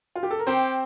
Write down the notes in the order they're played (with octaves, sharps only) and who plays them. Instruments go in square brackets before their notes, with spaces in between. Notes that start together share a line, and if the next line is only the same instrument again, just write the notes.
[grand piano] F4
G4
A4
A#4
[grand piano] C4 C5 [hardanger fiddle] G4